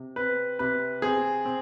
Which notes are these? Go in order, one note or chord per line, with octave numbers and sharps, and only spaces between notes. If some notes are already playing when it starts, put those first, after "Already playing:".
Already playing: C3
C4 B4
C3 B4
C4 G#4
C4